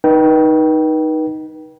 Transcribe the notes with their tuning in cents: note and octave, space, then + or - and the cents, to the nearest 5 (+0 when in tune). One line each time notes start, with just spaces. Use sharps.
D#4 +0 B4 -35 G5 -20